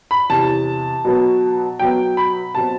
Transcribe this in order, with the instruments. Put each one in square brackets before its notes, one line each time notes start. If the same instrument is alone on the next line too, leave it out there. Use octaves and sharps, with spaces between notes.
[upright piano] B5
E2 C3 E3 A5
B2 F#3 B3
B2 F#3 B3 G5
B5
B2 F#3 C4 A5